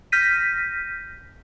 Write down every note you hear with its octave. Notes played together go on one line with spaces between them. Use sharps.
F6 G6 A#6 B6 D#7